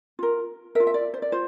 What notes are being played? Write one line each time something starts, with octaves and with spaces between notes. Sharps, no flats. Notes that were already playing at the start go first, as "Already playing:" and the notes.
F4 A#4
F4 A#4 E5
E5
D5
C5
D5
F4 C5